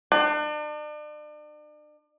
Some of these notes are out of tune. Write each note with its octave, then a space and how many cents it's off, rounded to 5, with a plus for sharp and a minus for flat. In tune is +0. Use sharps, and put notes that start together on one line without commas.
D4 +40